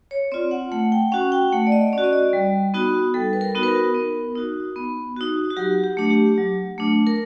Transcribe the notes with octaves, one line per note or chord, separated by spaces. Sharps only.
C#5
C4 F4 D5
F#5
A3 F#5
G5
C#4 F#4 F#5
G5
A3 F#5
D5
D#5
C#4 F#4 D5
D#5
D5
G3
B3 D#4 F#4
G3 A4
B4
A#4
B3 D#4 F#4
B4
A#4
B3
D#4 F#4
B3
D#4 F#4
F#4
F#3 G4
G4
A3 D4
G4
F#3
A3 D4
A#4